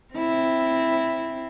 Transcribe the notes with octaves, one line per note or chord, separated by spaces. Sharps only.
C4 E4